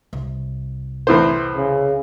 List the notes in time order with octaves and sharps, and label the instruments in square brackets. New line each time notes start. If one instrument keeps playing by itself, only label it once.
[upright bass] C2
[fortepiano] E2 A2 C5
[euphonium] C#3